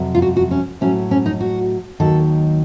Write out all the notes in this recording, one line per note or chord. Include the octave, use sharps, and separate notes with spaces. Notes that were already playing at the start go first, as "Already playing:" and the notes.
Already playing: F2 C3 F#3
F4
F#4
F#4
C#4
A2 F#3 C#4
C#4
D#4
F#4
D#2 D#3 F#3 A4